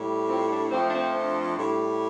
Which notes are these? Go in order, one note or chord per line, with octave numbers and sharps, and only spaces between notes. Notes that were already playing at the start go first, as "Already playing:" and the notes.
Already playing: A2 G3
C4 F4
D4
F2 F3 A3 C4
D4
C4
D4
A2 G3